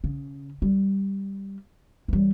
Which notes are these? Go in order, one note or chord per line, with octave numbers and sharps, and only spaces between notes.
C#3
G3
E3 G3